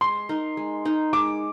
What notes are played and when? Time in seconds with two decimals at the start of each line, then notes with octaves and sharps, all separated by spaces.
0.01 G#3 C6
0.29 D#4 A#4
0.57 G#3
0.85 D#4 A#4
1.13 G#3 D6